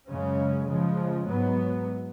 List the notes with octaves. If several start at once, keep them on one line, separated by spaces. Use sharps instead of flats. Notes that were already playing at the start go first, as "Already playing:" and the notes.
F#2 C#3 G#3 C#4
C#3 F3 G#3
G#2 F#3 B3